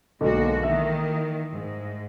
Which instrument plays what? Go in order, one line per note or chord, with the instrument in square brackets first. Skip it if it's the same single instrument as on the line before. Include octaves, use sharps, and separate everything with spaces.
[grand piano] B1 D3 [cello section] G#3 A#3 F#4
[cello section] D#3 E3 A#3 [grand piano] E5
[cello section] G#2